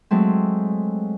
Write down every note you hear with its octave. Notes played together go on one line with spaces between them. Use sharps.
F#3 G#3 A3 C4